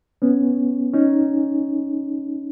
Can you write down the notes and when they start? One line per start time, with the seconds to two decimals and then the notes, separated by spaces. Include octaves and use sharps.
0.22 B3 C#4
0.94 C#4 D#4